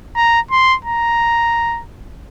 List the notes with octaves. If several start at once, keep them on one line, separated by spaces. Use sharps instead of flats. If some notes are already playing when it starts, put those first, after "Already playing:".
A#5
C6
A#5